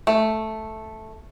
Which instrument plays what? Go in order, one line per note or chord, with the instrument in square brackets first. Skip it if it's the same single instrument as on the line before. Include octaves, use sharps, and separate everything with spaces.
[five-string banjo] A3